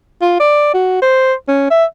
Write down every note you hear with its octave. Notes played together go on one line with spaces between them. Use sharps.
F4
D5
F#4
C5
C#4
E5